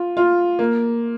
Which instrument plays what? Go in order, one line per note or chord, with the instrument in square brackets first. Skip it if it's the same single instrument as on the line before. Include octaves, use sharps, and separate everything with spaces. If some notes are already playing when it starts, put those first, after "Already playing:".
Already playing: [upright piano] F4
F4
A#3